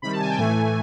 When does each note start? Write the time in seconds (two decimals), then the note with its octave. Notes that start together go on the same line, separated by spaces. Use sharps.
0.02 C3 D#3 G3 B5
0.12 A5
0.20 G#5
0.29 G5
0.38 A2 E3 A3 G#5